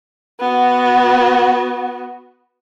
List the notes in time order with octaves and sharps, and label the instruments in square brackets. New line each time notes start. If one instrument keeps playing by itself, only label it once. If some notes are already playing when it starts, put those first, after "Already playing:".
[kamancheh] B3 F#4